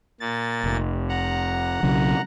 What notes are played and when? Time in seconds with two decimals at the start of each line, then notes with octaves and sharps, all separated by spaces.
0.20 A#2 A6
0.64 F1
1.09 F#5 A#5
1.83 B1 C#3 F#3